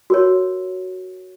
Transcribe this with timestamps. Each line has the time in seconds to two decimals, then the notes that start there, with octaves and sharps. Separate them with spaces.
0.10 F#4 A#4 C#5